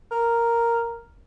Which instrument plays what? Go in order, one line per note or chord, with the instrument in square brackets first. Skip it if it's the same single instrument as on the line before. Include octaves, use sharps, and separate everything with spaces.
[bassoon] A#4